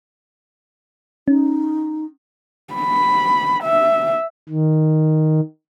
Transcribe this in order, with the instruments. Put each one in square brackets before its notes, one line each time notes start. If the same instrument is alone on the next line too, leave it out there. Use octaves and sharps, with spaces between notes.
[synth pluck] C#4 [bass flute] D#4
[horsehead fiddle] B5
E5
[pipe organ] D#3